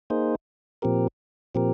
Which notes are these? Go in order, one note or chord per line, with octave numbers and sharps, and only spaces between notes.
A#3 D#4 G#4 C5
A#2 F3 C4 G4 A#4
A#2 F3 C4 G4 A#4